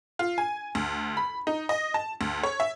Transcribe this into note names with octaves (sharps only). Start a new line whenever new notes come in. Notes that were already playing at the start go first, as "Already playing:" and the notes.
F4
G#5
D2
B5
D#4
D#5
A5
D2
C#5
E5